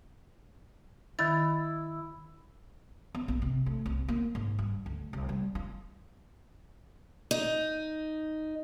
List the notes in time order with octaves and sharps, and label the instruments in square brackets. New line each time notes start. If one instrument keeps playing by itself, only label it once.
[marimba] D#3 A6 [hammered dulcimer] E4
[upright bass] B3
A#1
C3
A3
C2
A#3
G#2
G2
D2
C2
G3
F4
[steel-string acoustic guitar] D#4